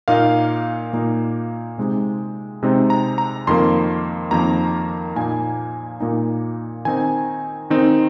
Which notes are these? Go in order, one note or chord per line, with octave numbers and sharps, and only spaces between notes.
A#2 A#3 D#4 F5
A#2 A#3 D#4
C3 G#3 C4 D#4
C3 G#3 C4 D#4
A#5
A#5
F2 D#3 A#3 C6
F2 D#3 A#3 A#5
A#2 A#3 D#4 G#5
A#2 A#3 D#4
D#3 C4 D#4 G#5
D#3 C4 D#4